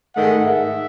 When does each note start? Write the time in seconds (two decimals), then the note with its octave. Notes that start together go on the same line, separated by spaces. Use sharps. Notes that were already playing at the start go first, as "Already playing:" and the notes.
0.15 G#2 D#3 A3 F#5
0.46 E5